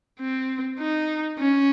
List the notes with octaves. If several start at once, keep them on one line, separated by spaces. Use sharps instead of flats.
C4
D#4
C#4